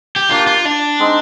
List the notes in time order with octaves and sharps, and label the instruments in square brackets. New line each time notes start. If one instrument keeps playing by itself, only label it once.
[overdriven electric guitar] G4
[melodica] A#3 D4 G4 D5 [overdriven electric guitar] F4
[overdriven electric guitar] F4
D4
[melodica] G#3 C4 D#4